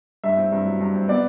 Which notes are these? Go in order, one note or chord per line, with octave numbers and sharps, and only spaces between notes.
G2 E5
C4
G2
F#3
G2
C4
B3 D5